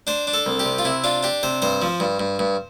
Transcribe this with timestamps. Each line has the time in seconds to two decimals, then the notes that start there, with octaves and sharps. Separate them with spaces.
0.07 D4 C5
0.27 D4
0.34 A4
0.46 C2
0.60 G4
0.65 C3
0.79 F4
0.84 C3 E4
1.04 D4 F4
1.23 D4 G4
1.43 C3 C5
1.62 G2 C5
1.82 F3
2.00 G2
2.20 G2
2.39 G2